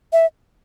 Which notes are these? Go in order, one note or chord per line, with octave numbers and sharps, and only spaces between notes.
E5